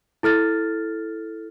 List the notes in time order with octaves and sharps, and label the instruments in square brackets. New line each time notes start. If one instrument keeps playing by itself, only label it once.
[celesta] E4 A4 F6 A6